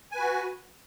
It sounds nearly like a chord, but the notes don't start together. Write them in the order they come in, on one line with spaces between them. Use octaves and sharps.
G#5 B4 F#4